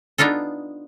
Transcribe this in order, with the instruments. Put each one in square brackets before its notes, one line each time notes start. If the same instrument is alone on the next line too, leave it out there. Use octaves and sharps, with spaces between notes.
[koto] B3 D4 D#4 F4 A4